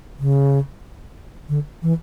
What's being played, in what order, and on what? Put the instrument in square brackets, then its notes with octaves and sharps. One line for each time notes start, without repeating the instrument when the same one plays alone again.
[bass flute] C#3
D3
E3